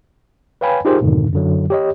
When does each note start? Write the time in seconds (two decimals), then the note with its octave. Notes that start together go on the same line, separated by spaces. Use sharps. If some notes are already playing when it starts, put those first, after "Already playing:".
0.61 B4 C#5 F5 G5 G#5 B5
0.85 D#4 F4 G4 G#4 A#4 C5
1.01 F2 G#2 B2 D3 D#3
1.33 F#2 D3 F#3
1.70 G4 C#5 D#5